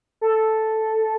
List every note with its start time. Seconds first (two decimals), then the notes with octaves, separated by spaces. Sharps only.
0.21 A4